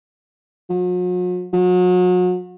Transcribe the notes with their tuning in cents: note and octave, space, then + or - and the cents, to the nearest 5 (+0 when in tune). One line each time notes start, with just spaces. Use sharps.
F#3 -45
F#3 -35